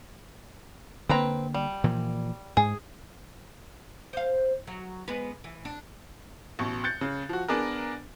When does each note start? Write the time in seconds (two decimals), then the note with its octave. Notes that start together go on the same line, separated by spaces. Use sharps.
1.09 D3 A#3 C4 B4 A#5
1.54 G3
1.84 A#2 E3 F3
2.57 G#2 G#4
4.13 C5 F5
4.67 F#3
5.08 G#3 B3 B4
5.44 E3
5.65 D4
6.59 A1 B2 C#6
6.84 F#6 G6 A6 C#7
7.01 C#3
7.29 F3 F#4
7.48 B3 D4 G#4 A#4